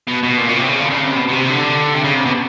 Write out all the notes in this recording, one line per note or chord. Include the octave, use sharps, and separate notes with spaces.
B2
B2
A#2
B2
C#3
C3
C#3
D3
C#3
C3
B2
B2
C3
D3
C3
C#3
C3
B2